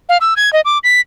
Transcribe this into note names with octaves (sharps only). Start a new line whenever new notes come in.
F5
E6
G#6
D#5
D6
B6